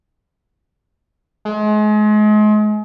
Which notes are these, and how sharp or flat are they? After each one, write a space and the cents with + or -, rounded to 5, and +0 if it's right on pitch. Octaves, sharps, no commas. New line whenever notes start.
G#3 +35